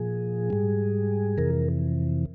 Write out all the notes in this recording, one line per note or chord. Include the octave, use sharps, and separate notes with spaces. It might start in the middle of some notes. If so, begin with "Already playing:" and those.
Already playing: A#2 F3 G#4
G#2 G3
F2 C3 E3 A#4